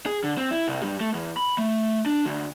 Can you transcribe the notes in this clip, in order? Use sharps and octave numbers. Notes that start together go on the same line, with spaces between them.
G#4
D3
C4
E4
C2
G2
A3
E2
B5
A3
D4
D2